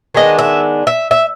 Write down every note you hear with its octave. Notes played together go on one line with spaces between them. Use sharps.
D#3 G#3 B3 D4 D#5
E5
E5
E5